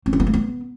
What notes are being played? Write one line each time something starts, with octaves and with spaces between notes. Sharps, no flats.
C4
C#4
B3
A#3
B3